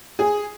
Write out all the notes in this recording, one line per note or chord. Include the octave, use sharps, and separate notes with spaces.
G#4